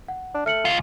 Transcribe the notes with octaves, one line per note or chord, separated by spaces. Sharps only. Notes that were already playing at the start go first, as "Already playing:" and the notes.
F#5
D4
A3 F6 C#7 F#7
C#2 F4